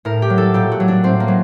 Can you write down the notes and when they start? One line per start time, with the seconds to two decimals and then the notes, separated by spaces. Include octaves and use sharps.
0.05 A2 A#4
0.22 G4
0.30 F#3
0.38 A4
0.54 A#2 G4
0.72 F#4
0.80 F#3
0.88 D4
1.03 A2 C4
1.20 A#3
1.28 F#3